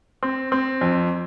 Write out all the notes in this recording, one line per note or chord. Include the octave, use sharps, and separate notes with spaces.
C4
C4
F2